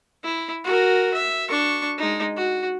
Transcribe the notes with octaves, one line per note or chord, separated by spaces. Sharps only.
E4
F#4 A#4
E5
D4 C#6
G#3 D#4
F#4